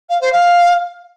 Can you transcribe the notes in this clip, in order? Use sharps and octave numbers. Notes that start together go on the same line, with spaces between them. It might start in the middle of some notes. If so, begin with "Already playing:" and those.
F5
C5
F5